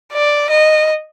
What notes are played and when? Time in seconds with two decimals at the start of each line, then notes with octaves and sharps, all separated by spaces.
0.13 D5
0.50 D#5